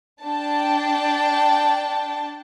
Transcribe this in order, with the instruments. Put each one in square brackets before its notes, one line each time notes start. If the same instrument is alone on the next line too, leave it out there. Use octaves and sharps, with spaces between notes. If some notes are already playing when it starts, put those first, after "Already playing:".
[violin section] D4 G5 A5